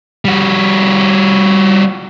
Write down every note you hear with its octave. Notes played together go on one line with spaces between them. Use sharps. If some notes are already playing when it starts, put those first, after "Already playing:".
G3 F#4